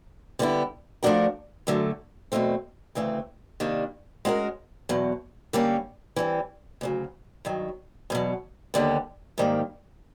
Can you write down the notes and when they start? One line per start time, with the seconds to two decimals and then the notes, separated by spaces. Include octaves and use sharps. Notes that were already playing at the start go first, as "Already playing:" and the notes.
0.39 D3 G3 B3 E4
1.03 F3 A3 D4 F#4 A#4
1.67 F#2 D3 F#3 A3
2.32 E2 B2 F#3 A3 C4
2.95 D2 C#3 E3 A3 C4
3.60 C3 D#3 G3 A#3 D4
4.25 G#3 C#4 F#4 A#4
4.89 E2 B2 F#3
5.53 D3 G3 A#3 C#4
6.16 E3 G3 C4
6.81 D2 C#3 F#3
7.45 G2 D#3 F#3
8.10 E2 B2 F#3
8.74 D#2 D3 G3 B3
9.38 G#2 D#3 G3 A#3